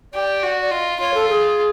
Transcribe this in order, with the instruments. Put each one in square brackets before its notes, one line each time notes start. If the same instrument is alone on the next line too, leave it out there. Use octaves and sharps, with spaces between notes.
[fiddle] G4 [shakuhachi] D5
[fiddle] F#4
[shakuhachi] D5
[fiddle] F4 [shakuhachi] D#5
[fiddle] F4 [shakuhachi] C#5
[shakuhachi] A4
G#4